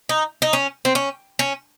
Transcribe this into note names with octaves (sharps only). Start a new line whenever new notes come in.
D#4
D#4
C#4
C4
C#4
C#4